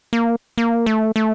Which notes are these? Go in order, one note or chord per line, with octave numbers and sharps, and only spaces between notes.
A#3
A#3
A3
A3